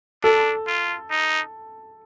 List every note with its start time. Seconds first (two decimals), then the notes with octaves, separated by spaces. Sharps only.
0.23 D4 A4
0.67 F4
1.10 D#4